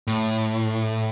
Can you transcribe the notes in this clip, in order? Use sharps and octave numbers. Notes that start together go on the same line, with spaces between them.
A2